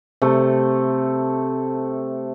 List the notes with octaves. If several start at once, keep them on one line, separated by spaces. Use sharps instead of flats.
C3 A3